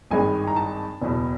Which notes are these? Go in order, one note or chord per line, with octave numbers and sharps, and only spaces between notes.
G#1 G2 D#3 G#3 G#5
A#5
A5
F#1 E2 B2